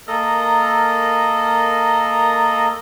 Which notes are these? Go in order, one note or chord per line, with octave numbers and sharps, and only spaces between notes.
A#3 A4 A#4 D#5 A#5